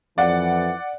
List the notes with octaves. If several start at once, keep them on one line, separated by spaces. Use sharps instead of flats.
F2 E3 D5 F#5